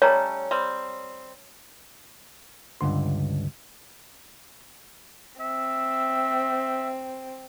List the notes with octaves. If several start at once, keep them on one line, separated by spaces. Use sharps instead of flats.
G3 A3 C#4 C#5 A#5
G3 C4
C#2 G2 D3 C6
C4 E5